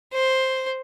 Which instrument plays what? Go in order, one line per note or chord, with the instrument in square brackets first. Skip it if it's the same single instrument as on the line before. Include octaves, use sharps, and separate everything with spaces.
[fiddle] C5